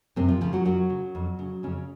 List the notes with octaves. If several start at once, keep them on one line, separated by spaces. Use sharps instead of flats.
F#2 C3 C4
F3 F4
C#3 F3 F4
F#3 F#4
F#2 F#3 F#4
C#3
F2
C#3
F2 C#3 C#4